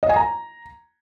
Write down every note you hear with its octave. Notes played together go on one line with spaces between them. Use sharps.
D#5
G#5
A#5